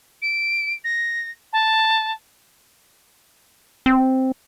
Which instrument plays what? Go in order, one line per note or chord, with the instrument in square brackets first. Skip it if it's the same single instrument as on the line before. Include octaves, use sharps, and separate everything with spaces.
[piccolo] D7
A#6
A5
[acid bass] C4